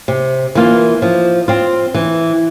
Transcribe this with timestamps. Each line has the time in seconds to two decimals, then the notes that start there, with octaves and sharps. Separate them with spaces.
0.08 C3
0.55 E3 A#3 F4
1.02 F3
1.48 C4 F4
1.94 E3